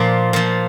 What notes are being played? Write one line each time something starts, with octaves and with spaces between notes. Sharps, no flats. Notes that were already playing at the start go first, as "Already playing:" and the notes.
Already playing: A#2 F3 D5
A#2 F3